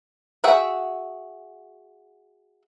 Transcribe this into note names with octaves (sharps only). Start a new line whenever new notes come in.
F#4 G#4 E5 F#5 G5